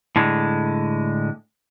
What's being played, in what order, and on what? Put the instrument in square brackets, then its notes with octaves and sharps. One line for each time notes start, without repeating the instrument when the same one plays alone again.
[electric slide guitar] A2 D3 G#3